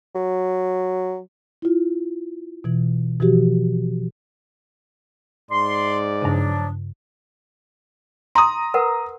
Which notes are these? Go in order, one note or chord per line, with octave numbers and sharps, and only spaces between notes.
F#3
E4 F4
B2 E3
B2 E3 F3 F#4 G4
G#2 D5 C6
G2 C#3 F3 F#3 D4
A#5 C6 D#6
A#4 B4 F#5